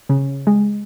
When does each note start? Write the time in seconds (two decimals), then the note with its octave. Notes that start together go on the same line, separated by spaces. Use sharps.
0.09 C#3
0.47 G#3